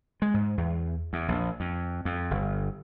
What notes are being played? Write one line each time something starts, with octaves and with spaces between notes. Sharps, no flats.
G#3
G#2
E2
E2
A#1
F2
F2
G1